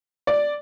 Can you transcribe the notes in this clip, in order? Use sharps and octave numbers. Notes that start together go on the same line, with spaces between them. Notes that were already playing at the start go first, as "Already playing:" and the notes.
D5